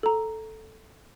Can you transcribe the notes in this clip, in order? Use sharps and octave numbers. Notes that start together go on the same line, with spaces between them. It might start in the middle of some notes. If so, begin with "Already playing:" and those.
A4 A#5